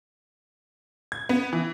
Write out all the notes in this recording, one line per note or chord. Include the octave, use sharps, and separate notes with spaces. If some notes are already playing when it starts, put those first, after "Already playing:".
G#6
B3
E3